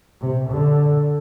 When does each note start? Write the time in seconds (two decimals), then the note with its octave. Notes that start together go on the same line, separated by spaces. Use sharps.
0.21 C3
0.50 D3